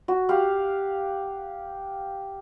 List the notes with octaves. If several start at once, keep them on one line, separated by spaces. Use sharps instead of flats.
F#4
G4 F5 F#5